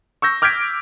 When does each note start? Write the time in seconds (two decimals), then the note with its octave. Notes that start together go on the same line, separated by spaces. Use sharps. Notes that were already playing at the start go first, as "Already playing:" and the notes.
0.22 C#6 E6 G6 A#6
0.42 D6 F6 G6 G#6 B6 D7